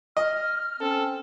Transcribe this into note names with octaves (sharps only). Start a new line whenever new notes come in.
D#5 F6
C4 C#4 A4